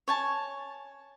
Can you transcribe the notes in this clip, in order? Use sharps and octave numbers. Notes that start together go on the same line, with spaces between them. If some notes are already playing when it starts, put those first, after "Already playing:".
C#5 G#5 A5